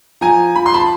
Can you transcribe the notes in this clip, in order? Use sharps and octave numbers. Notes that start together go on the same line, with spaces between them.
F3 G#5 A#5
F3 B5
C6
A5 B5